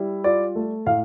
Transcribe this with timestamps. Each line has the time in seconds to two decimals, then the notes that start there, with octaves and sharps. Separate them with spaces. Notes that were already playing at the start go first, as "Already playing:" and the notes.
Already playing: G3 E4
0.24 F4 D5
0.55 A3
0.86 A2 F5